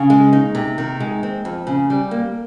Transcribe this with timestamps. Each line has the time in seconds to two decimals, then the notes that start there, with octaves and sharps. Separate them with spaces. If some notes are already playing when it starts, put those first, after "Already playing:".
Already playing: C#3
0.10 G#3
0.33 D#4
0.55 C3
0.78 D#3
1.00 G#3
1.23 C4
1.45 F2
1.67 C#3
1.90 G3
2.11 A#3